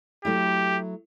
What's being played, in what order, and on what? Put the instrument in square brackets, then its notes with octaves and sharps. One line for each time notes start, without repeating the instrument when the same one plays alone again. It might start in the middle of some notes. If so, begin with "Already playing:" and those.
[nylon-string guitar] F#3 A3 E4 [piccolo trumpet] G4